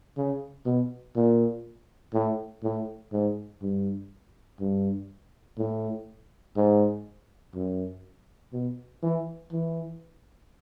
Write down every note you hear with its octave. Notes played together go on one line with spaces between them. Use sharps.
C#3
B2
A#2
A2
A2
G#2
G2
G2
A2
G#2
F#2
B2
E3
E3